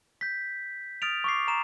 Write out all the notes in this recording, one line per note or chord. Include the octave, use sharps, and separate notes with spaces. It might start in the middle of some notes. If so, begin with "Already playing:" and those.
G6 B6
D#6 F6 A6 D7 F7
C#6 D6 C7
A#5 C#6 E7